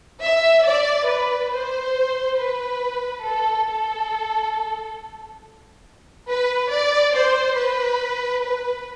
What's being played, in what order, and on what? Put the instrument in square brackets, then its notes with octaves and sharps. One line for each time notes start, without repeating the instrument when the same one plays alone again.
[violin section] E5
D5
B4
C5
B4
A4
A4
B4
D5
C5
B4
B4